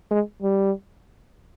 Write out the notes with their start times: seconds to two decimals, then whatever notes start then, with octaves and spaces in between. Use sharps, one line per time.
0.11 G#3
0.43 G3